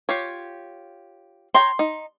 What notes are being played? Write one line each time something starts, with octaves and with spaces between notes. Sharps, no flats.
F4 G4 C#5
C#5 G5 A#5 C6
D#4